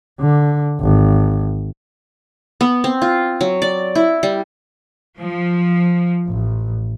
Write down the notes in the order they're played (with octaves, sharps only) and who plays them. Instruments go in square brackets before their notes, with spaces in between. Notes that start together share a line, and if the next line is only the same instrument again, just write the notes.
[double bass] D3
G#1
[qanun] B3
C4
F4
F#3
D5
E4
G3
[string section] F3
A1